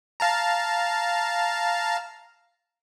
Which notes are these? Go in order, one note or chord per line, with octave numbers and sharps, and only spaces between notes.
F5 A5 A#5